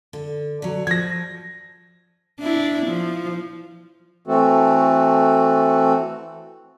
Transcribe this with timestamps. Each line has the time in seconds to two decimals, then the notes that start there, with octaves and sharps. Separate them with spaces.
0.13 D3
0.62 D3 F#3
0.87 F3 G#6 A#6
2.40 D4 E4
2.86 F3
4.27 E3 A3 C4 F#4 A4